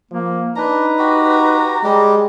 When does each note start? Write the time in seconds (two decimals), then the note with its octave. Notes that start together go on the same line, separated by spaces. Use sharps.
0.11 F3 A#3
0.56 D4 D#4 B4 A#5
0.99 F#4 G4
1.84 G3 G#3 G4